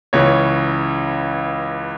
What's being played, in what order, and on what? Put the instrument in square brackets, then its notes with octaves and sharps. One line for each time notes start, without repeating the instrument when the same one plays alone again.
[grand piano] C#2 C#3 E3 C#5